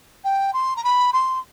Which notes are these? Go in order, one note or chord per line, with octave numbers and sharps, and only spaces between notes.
G5
C6
A#5
B5
C6